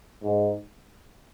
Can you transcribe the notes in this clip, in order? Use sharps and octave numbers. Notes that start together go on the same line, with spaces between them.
G#2